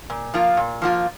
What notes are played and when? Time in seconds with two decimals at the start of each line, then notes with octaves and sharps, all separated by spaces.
0.10 A#2
0.34 F3 A#3 F4
0.57 A#2
0.82 F3 A#3 F4